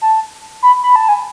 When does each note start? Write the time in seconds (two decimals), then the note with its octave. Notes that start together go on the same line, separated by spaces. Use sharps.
0.02 A5
0.62 B5
0.83 B5
0.96 A5
1.09 G#5